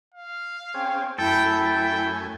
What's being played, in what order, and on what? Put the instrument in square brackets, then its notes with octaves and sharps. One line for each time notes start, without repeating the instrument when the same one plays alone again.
[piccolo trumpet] F5
[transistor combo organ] C4 C#4 G#4 [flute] G5
[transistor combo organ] F#2 A3 G#5 [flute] E4 [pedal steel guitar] A4 [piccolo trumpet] G5
[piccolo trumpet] G5